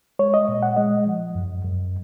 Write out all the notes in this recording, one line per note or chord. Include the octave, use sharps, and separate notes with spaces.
G#3 C#5
D#5
A#2
F#5
G#3 D#5
F3
F#2
F#2